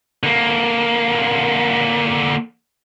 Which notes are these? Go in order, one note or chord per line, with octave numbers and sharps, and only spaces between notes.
D3 A#3